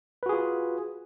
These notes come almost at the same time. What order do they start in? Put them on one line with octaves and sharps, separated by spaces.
B4 F#4 G#4 F4